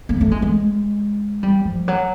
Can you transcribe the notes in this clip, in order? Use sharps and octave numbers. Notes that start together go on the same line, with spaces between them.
A#3
A3
G#3
G#3
G3
F3
F#3